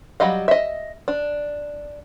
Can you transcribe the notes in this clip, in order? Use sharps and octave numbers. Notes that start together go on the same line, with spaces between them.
F#3 G3 D#5 F5
D#5 E5
D4